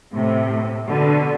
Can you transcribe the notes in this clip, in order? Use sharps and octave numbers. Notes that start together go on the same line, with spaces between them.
A2 C3
B2 D3